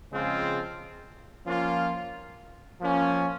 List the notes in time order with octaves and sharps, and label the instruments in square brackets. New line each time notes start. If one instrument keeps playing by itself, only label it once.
[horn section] C#3 F3 G#3 C4 F4
F3 A#3 C#4 F4
F3 A#3 C#4